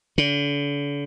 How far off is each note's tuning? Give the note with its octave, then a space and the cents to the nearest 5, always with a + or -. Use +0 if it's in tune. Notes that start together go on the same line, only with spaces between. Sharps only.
D3 -40